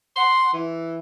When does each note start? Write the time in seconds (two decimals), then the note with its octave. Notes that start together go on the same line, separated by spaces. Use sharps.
0.17 F#5 C6
0.54 E3